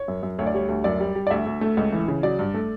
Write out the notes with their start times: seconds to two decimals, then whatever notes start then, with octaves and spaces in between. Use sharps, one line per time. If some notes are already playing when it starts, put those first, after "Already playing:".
Already playing: C#5
0.08 F#2
0.23 F#2
0.39 D2 C#5
0.47 D5
0.54 G3 C#5
0.69 D2
0.84 F#2 D5
1.00 G3
1.15 G3
1.27 D5
1.30 D2 E5
1.46 D2
1.61 A3
1.77 C#2
1.92 E3
2.08 C#3
2.23 F#3 D5
2.39 G2
2.54 A3